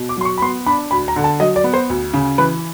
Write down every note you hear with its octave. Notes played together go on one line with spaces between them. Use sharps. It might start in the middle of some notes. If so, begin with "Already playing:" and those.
Already playing: B2
D6
F#3 C6
C#6
B5
B3 C6
D4 B5
D2 B5
A#5
D3
A5
F#3 D#5
D5
B3
C5
D2
C#3
E3 B4